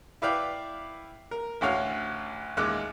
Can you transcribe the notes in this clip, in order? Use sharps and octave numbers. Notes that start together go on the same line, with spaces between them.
E4 B4 D5 F5 G5
A#4
A1 D2 F#4 C#5 F5
A1 D#2 G#3 F#6